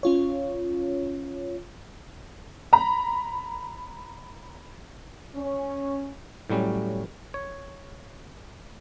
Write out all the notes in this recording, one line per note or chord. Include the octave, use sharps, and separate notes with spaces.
C#4 F4 C#5
A#5 B5
C#4
A2 F#3 G3 C#4
C#5